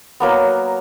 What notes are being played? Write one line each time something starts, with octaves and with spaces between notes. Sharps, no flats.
F#3 A#3 B3